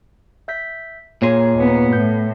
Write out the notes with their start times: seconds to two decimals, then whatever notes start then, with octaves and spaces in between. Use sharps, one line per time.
0.48 E5 G6 B6
1.22 A#2 A#3 G#4 C#5 C6
1.54 D#2 B3
1.93 A2 G6